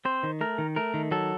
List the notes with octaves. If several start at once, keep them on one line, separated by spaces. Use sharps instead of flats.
C4 C5
D#3
A3 A#4
D#3
A3 A#4
D#3
F#3 A4